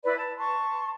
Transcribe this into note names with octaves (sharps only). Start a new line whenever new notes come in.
E4 B4 D5
A5 B5
A5 C6 C#6